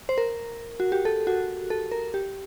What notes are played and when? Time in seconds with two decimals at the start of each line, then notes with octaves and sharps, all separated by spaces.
0.09 C5
0.18 A#4
0.80 F#4
0.92 G4
1.05 A4
1.27 F#4
1.70 A4
1.92 A#4
2.14 G4